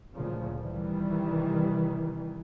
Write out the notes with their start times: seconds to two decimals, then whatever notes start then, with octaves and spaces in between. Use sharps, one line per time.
0.13 D2 A#2 C#3 F3
0.60 C3 D#3 E3 G3